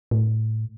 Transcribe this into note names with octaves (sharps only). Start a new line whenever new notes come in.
A2